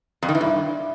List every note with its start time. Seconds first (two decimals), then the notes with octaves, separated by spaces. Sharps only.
0.23 F2
0.29 D#3
0.35 E3
0.41 G2